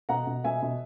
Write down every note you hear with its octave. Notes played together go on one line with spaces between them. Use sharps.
B2 F#5 A#5
B2
B2 E5 G#5
B2